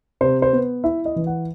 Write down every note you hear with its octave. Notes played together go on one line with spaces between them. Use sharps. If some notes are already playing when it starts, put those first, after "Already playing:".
C3 C5
C5
B3
E4 E5
D#5
E3
F#5